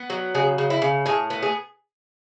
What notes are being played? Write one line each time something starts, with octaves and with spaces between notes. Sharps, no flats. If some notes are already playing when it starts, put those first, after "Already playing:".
Already playing: B3
F#3
C#3 G#4
C#3
E4
C#3
A2 G#4
B3
G#4